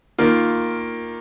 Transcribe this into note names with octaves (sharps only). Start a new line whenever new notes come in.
D#3 A#3 F4